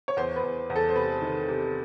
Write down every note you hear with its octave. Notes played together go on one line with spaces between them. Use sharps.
C#5
E2 C5
B4
E2
E2
A4
C5
C3 B4
D#3
C3